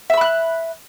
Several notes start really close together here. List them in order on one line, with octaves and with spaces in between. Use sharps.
E5 E6 B5 F#6